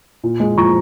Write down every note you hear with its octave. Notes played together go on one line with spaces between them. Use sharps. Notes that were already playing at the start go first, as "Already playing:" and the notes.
A#2
G#3
F3 A#5 C#6